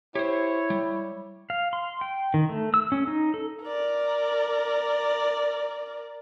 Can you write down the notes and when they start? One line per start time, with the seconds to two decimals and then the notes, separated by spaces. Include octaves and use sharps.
0.15 E4 G4 C5 C#5
0.70 G3
1.50 F5
1.73 C6
2.01 G5
2.34 D#3
2.49 A3
2.74 E6
2.92 C#4
3.07 D#4
3.34 A4
3.63 A#4 D5